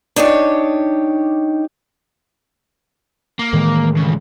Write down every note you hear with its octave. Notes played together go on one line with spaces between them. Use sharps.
D4 D#4 G4 C#5
A#3
A2 D#3 E3 G#3
C#2 C#3